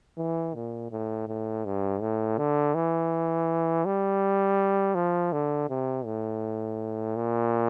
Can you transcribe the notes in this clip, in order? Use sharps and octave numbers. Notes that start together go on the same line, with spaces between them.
E3
A#2
A2
A2
G2
A2
D3
E3
G3
F3
D3
C3
A2
A#2